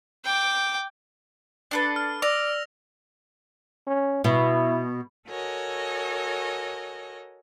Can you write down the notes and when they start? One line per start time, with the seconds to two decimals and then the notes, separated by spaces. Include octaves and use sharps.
0.25 G5 D6
1.71 D4 A4 B4
1.96 F6
2.22 D5 E6 A#6 F7
3.87 C#4
4.24 B2 E4
5.28 F#4 A4 A#4 C#5 D#5 G#5